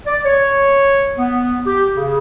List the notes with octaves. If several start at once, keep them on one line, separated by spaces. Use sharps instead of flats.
D5
C#5
B3
G4
C#3